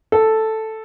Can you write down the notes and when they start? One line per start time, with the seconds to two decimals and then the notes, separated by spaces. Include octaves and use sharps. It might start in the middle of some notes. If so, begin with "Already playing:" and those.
0.12 A4